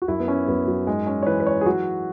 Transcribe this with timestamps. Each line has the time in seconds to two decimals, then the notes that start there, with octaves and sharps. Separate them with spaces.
0.02 F#4
0.08 F#2 E4
0.20 B3
0.28 C#4
0.47 F#2 B3
0.67 F#3
0.87 G#2 G#3
1.07 C#4
1.23 C#5
1.26 E3 B4
1.40 B4
1.47 C#5
1.61 G#4
1.66 F#3 F#4